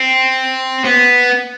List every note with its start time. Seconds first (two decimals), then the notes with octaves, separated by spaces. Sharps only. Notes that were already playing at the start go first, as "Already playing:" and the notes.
Already playing: C4
0.84 B3